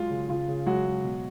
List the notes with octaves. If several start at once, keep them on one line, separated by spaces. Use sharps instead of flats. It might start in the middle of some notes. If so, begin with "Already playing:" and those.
Already playing: F#3 G#3 F4
C#3
C#3 F4
C#3
F#3 G#3 F#4
G#3
B2